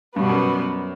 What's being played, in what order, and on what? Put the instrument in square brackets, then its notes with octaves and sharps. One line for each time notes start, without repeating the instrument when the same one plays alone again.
[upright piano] G2 [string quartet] B2 G3 B3 F#4
[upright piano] F#2